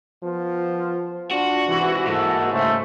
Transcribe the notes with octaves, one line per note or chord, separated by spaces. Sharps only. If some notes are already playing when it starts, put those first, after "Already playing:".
F3 B3 F4
D4 F4 F#4
G#2 C3 E3
G#2 A#3 E4 F#4 A4
C#3 A3 C5